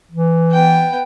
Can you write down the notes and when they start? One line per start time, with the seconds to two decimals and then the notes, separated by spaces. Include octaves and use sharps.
0.11 E3
0.52 B3 G5